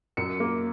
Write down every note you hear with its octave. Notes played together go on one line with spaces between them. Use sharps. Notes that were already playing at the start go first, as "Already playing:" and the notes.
F#2 C#7
A#3